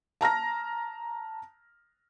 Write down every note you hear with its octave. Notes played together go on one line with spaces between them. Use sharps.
A5 A#5 F6 A#6